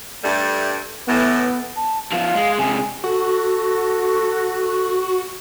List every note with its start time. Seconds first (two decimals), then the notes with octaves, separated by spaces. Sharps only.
0.23 G2 G3 A3
1.08 A2 E3 B3
1.76 A5
2.12 F3 B3 F5
2.34 G#3
2.59 C3 G#3 G#5
3.04 F#4 A4